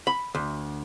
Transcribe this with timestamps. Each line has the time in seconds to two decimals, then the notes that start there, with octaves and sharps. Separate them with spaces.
0.07 B5
0.35 D2